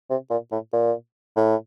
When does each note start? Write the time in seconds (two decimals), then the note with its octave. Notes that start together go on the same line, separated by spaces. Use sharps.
0.10 C3
0.30 A#2
0.52 A2
0.73 A#2
1.37 A2